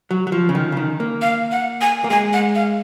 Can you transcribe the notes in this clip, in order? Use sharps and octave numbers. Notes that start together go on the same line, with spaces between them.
F#3
F#3
F3
C#3
D#3
C#3
D#3
A#3
F5
F#5
G#5
A#3
G#3 G#5
F#5
F5